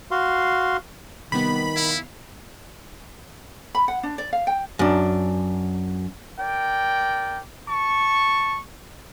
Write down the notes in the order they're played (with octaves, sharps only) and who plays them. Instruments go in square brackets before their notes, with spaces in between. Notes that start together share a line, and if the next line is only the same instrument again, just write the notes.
[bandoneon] F#4 F5 C6
[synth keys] C3 G3 B3 [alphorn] D#3 [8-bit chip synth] B5
[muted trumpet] E4 [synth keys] F5
[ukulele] B5
F#5
D4
D5
F5
G5
[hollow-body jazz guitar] F#2 D4
[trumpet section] A#4 D5 G5
A5 C#6